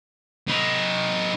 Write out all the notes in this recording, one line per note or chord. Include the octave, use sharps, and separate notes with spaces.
D#4 B4